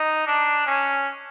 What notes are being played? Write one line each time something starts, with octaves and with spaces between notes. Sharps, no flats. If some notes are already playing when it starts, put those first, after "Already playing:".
Already playing: D#4
D4
C#4